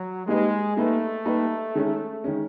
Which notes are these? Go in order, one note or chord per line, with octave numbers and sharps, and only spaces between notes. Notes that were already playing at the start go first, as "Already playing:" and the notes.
Already playing: F#3
G3 G#3 A#3 D#4 G4 B4
G3 A3 A#3 D#4 G4 B4
G3 A#3 D#4 G4 B4
D#3 G#3 C#4
D#3 G#3 C#4